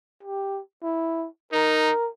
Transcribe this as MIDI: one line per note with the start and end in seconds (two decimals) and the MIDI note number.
0.23 0.60 67
0.83 1.27 64
1.53 1.91 63
1.53 2.09 70